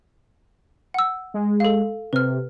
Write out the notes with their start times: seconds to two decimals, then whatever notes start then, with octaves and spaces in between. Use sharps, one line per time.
0.94 F#5 E6
1.34 G#3
1.60 A4 F5
2.13 C3 B4 F6